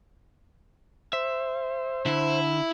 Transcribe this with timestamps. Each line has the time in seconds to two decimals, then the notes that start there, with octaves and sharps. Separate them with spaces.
1.13 C5 E5
2.06 D3 E4